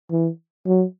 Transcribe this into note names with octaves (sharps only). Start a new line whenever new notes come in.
E3
F#3